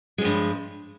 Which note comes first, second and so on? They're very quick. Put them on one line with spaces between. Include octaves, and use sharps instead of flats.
G#3 F3 G2